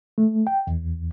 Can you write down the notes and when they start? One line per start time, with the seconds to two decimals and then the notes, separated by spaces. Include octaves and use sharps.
0.18 A3
0.47 G5
0.67 E2